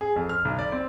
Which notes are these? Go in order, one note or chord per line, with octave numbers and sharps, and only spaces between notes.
G#4
F2
F6
B1
D5
C4